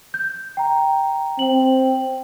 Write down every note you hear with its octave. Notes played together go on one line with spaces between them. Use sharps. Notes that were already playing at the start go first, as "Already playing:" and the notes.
G6
G5 A#5
C4 G5 F#7